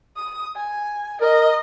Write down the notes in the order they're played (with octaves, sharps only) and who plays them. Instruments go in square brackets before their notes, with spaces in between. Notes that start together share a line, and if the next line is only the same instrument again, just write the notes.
[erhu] D#6
G#5
[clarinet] A#4 [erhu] D#5